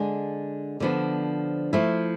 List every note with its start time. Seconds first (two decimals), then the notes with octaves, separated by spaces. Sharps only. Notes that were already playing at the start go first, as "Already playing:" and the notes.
Already playing: D3 G#3 D4
0.80 D3 F3 B3 D4
1.73 F3 A3 E4